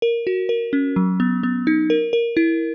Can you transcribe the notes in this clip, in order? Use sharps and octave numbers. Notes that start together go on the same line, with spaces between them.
A#4
F#4
A#4
C#4
F#3
B3
B3
D#4
A#4
A#4
E4